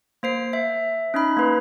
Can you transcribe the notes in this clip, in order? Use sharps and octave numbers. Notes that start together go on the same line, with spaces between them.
A#3 C5 C7
E5
C#4 D#4 B5
A#3 B4